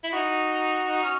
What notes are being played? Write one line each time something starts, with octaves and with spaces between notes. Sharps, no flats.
E4
D#4 F#4
D#4
C#4